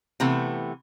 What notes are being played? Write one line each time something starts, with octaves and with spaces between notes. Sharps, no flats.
C3 E3 A3 B3